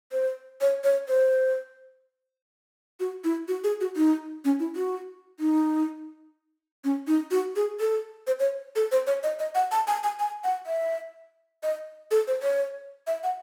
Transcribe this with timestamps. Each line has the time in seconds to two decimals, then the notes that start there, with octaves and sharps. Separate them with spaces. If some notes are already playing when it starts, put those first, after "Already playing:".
0.12 C5
0.61 C#5
0.84 C#5
1.08 C5
3.00 F#4
3.24 E4
3.48 F#4
3.64 G#4
3.81 F#4
3.96 D#4
4.45 C#4
4.60 E4
4.76 F#4
5.40 D#4
6.84 C#4
7.07 D#4
7.31 F#4
7.56 G#4
7.80 A4
8.27 C5
8.40 C#5
8.76 A4
8.92 C5
9.07 C#5
9.23 D#5
9.39 D#5
9.55 F#5
9.72 A5
9.87 G#5
10.03 G#5
10.19 G#5
10.44 F#5
10.67 E5
11.63 D#5
12.11 A4
12.27 C5
12.43 C#5
13.07 E5
13.23 F#5